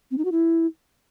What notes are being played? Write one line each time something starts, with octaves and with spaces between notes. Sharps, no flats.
C4
D#4
F#4
E4